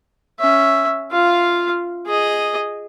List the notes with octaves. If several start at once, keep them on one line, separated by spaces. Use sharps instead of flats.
C#4 E5
F4 F5
G#4 D#5